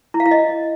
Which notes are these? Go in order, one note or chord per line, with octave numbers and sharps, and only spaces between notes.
E4
F5
E4
D#5